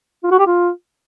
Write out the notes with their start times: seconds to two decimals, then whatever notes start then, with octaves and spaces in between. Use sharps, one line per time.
0.24 F4
0.31 F#4
0.39 G4
0.47 F4